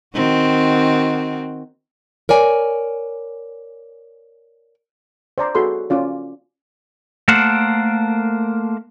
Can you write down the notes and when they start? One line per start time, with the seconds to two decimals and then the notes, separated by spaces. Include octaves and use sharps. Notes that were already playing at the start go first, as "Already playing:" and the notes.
0.14 D#3 C4 F#4
2.29 A#4 C#5 D5 G#5
5.38 C5 D5 A#5 C6
5.55 F#4 G#4 A4 B5 C6
5.90 C#4 F4 D5
7.28 A3 A#3 A4 A#4 C5 F#5